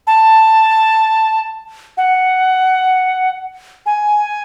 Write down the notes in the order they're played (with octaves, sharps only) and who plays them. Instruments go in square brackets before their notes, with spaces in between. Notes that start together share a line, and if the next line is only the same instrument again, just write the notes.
[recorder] A5
F#5
G#5